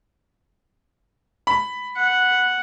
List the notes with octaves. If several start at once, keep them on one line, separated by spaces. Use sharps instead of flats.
B5
F#5